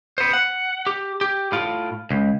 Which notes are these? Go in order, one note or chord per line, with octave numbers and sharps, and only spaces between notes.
B3 C5
F#5
G4
G4
A2 F4
C#2